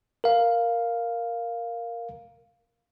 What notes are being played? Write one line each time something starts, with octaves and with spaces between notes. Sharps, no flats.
A#4 F5